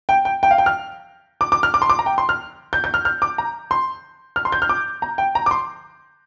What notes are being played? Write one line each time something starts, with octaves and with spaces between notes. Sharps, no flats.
G5
G5
G5
F5
G5
F6
D6
D6
F6
D6
C6
D6
A#5
G5
C6
F6
G6
G6
F6
F6
D6
A#5
C6
F6
C6
G6
F6
D6
A#5
G5
A#5
D6
C6